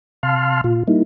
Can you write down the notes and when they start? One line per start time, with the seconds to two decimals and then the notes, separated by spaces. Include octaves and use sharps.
0.23 C3 F5 A5 C6 F6
0.64 A#2 F4
0.88 G3 A#3 D#4 E4